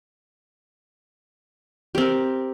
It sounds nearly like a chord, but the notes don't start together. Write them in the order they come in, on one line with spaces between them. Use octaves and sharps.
G4 C4 A#4